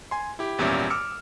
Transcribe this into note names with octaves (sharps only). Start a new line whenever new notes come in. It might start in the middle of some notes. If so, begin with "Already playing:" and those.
G#5 C6
E4 G4
G#1 E2 A#2 G3 C#4 E5
D6 E6 F6 C#7